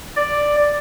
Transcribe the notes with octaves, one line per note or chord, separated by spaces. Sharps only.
D5